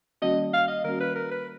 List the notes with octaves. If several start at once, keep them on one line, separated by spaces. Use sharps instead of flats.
D#3 G3 A#3 C#4 F#4 D#5
F5
D#5
D#3 G3 A#3 C#4 F#4 A#4
B4
A#4
B4